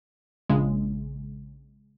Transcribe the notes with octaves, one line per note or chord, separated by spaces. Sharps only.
A#1 C#3 G#3